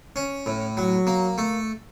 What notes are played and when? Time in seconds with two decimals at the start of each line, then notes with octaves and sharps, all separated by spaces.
0.16 C#4
0.46 A2
0.77 F#3
1.07 A#3
1.38 A3